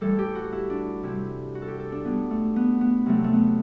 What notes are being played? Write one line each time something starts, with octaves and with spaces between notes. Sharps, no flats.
A2 E3 G3 A4
G4
F#4
E4
D4
C3 G3 E4
F#4
A4
G4
A4
D4
A2 G3 B3
A3
B3
B3
C3 F#3 A3
A3
B3